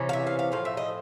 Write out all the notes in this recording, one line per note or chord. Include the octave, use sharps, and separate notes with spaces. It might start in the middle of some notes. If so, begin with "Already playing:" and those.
Already playing: C3 E3 C#4
F5
E5
F5
F5
A2 F3 F5
E5
D#5